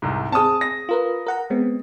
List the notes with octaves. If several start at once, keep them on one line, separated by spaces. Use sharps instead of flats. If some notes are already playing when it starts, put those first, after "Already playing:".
C2 G#2
C4 G#4 A5 D#6
A#6
F4 A#4 B4
A#4 F#5 A#5
G#3 B3 C4